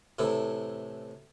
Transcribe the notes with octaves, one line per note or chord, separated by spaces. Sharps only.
A2 C3 E3 A4